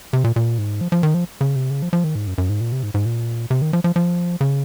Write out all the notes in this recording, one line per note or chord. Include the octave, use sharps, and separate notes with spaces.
C3
A#2
A#2
G#2
F3
F3
D#3
F3
C#3
C3
C#3
F3
F3
D#3
G#2
F#2
F#2
G#2
A#2
C3
G#2
G#2
A#2
C3
D#3
F3
F3
F3
C#3